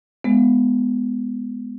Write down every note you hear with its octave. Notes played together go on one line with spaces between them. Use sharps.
G#3 B3